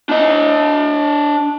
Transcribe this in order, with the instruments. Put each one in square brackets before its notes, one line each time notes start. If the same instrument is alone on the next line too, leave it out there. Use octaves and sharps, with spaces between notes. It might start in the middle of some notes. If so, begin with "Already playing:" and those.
[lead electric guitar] D4 D#5